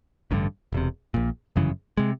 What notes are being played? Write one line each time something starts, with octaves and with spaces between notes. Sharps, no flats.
A1 G2 D3 D#3
E1 E2 C3
A#1 A#2
G1 F#2 C#3 E3
C3 G#3